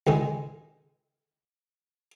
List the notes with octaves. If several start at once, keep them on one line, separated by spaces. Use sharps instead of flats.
C#2 D#3 G#3